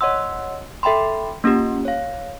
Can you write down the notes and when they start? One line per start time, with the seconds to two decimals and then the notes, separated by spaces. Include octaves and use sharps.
0.01 C#5 D#5 F#5 C6 E6
0.83 A4 E5 G5 B5 C6
1.44 A#3 C#4 F4 G4
1.85 C#5 F5